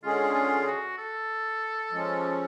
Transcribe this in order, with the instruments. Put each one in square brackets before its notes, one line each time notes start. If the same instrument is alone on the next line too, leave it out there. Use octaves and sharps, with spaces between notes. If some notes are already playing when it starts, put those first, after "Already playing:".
[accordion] D3 G#3 C#4 G#4 [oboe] F4
[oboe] F4
F#4
A4
[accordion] F3 G#3 C#4